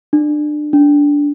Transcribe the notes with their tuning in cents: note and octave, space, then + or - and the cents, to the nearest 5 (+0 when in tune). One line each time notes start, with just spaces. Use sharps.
D4 +25
D4 -15